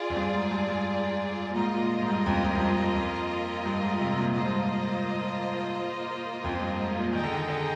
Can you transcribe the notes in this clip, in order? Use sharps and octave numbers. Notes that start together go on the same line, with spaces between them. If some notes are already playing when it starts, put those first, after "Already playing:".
Already playing: F4 G#4 D5
F2
G2
G#2
G2
G2
A#2
G#2 A#3 F4 A#4 D#5
A#2
G#2
G2
F2
F2
F2
G2
G2
F2
G2
G#2
C3
C3
A#2
G#2 A#3 F4 C5 D#5
G2
G#2
F2
G2
G#2
A#2
D#3 D#4 G#4 D#5 G5
D3
D#3
D3